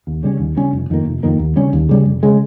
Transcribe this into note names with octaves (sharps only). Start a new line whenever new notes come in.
D#2
C#3 G3 C#4
D#2
C#3 G3 C#4
F1
F2 D#3 A#3
F1
F2 D#3 A#3
D#2
C#3 G3 C#4
D#2
C#3 G3 C#4
F1
C#3 G#3